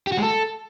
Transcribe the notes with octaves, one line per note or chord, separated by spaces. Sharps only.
G4
F#4
G#3
A4